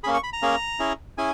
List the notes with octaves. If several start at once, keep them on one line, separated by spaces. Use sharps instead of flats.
A#3 C#4 G#4 B5
C#6
B5
A#5
A#3 C#4 G#4
C#4 E4 G#4
C#4 E4 G#4 G#5